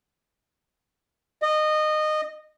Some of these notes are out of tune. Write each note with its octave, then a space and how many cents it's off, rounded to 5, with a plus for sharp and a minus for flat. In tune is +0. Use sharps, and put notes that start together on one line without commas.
D#5 -20